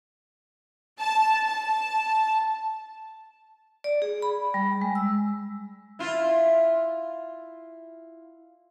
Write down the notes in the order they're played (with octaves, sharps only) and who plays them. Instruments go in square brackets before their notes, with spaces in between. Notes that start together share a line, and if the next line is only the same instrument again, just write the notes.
[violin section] A5
A5
[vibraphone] D5
G#4
B5
G3
G#3
E6
[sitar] E4 F4